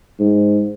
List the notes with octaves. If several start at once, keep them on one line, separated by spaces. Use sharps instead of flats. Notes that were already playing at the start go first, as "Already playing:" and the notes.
G#2